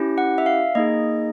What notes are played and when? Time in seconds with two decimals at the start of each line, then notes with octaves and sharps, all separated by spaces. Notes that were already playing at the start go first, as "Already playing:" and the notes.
Already playing: C#4 E4 G4
0.18 F#5
0.38 E5
0.46 F5
0.75 A#3 D#4 G#4 D#5